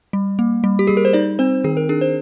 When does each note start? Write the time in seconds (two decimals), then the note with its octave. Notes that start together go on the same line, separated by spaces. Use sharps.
0.13 G3
0.39 A#3
0.64 G3
0.79 G4
0.87 G3 G#4
0.97 A#4
1.05 C5
1.13 D#4 D5
1.39 C4 C5
1.64 D#3 G#4
1.77 A#4
1.89 D4 G#4
2.01 C5